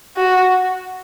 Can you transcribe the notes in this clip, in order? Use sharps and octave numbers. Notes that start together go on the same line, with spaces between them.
F#4